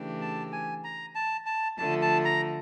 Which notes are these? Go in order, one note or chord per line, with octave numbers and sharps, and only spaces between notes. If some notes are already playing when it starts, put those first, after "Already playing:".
Already playing: C#3 E3 A3 D4 G4
A5
G#5
A#5
A5
A5
D3 F3 A3 A5
A5
A#5